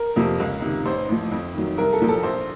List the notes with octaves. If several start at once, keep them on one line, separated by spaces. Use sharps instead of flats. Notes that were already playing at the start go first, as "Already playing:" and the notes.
Already playing: A#4
F2 C3 F3
C#2
C3 D#3
A1 C5
A2 F3
F2
D#3 F#3
C2 A#4
A4
A#2 F3
A4
A#1 C5